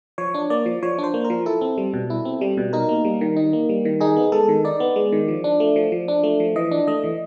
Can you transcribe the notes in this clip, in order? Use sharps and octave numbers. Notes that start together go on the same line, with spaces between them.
F3 C#5
D4
A#3 D5
F3
F3 C#5
D4
C5
A#3
A#4
F3
E4 A4
C4
G3
B2
E4
C4
G3
B2
D#4 A#4
A#3
G3
D#3
D#4
A#3
G3
D#3
D#4 G#4
B3
G#3 A4
D#3
D#4 D5
B3
G#3
D#3
F3
D4
A3
F3
F3
D4
A3
F3
E3 D#5
D4
A3 D#5
E3